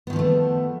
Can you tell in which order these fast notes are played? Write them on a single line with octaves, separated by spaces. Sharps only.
B3 D#3 F3 C#4 A3